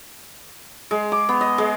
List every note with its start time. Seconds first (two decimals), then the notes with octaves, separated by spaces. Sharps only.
0.91 G#3
1.12 D6
1.29 B3
1.41 D#5
1.58 G#3